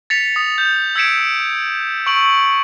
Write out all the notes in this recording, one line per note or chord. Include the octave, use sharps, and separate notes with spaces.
A6 B6 C#7 F7
D#6
G6
E6 G#6 B6 C#7 D7 E7
C#6 E6 D7 F#7